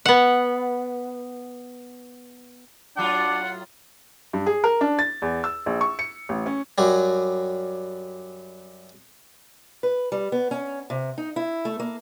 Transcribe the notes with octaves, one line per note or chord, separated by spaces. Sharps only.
B3 F#5
A2 F#3 D4 F4 F#5
G2
G#4
A#4
D4
A6
E2
E6
A#1
C#6
C#7
A1
C#4
F#2 F#3 G3
B4
G3
B3
C#4
C3
D#4
E4
A3
A#3